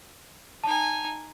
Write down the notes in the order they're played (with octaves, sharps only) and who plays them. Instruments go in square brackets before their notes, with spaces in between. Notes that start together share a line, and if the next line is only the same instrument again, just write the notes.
[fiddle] D#4 G#5 [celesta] A5